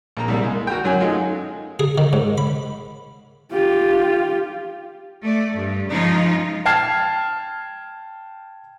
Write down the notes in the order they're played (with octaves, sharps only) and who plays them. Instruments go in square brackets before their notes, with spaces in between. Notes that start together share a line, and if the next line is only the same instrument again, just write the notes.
[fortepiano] A#1 A#3 A#5
C2 G3 A#3
G#3
F#4 A#4 G5
F#2 F#3 C#4 G#5
G#3 A3 D#4 F4
[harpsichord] G#4
D#3
G#2
B5
[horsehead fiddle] F4 G4
[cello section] A3 D5
G2
C#3 F3 G#3 D#4 F4
[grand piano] G5 A5 F6 G#6 C7